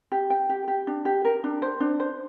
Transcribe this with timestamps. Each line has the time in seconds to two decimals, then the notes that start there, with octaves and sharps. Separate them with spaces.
0.12 G4
0.30 G5
0.49 G4
0.68 G4
0.87 D4
1.05 G4
1.25 A#4
1.44 D4
1.62 C5
1.80 D4
2.00 C5